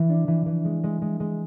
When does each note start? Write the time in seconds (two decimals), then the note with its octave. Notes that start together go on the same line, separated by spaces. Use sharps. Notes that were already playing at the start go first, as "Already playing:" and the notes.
Already playing: E3
0.09 D4
0.28 E3
0.46 E3
0.65 G#3
0.84 G#3
1.02 G#3
1.20 G#3